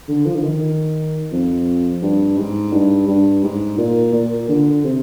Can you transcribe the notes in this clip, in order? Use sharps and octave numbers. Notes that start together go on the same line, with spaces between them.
D3
F3
D3
D#3
F2
G2
G#2
G2
G2
G#2
A#2
A#2
D3
C3